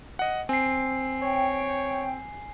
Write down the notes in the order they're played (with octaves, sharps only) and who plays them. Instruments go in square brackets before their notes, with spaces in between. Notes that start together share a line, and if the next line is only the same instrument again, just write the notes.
[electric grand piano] D#5 F#5
[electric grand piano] C4 [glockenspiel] G#5 C7
[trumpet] C#5 [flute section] G5